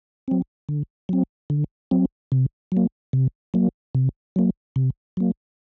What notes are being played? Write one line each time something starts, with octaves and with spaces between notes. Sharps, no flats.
F#3 C4
D3
F#3 C4
D3
F#3 C4
C3
F#3 A#3
C3
F#3 A#3
C3
F#3 A#3
C3
F#3 A#3